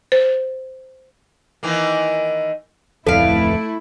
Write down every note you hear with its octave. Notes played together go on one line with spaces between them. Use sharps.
C5
D#3 E3 A#3
D1 F2 A3 E4 A4 B4 F5 D7